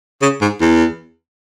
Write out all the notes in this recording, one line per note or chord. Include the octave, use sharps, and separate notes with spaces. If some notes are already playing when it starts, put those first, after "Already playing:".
C#3
G#2
E2